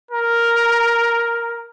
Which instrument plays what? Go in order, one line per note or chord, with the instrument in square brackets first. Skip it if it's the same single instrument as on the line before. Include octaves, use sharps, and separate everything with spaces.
[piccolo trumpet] A#4